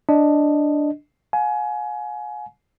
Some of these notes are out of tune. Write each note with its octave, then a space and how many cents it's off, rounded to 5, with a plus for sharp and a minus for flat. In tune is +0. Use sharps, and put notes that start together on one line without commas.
D4 +0 D#5 +0
F5 +45 G#5 +25